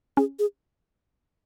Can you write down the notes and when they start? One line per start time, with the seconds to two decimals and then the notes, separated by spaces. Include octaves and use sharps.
0.17 C#4 G#4
0.39 G#4